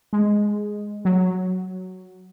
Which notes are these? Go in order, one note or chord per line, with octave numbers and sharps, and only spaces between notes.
G#3
F#3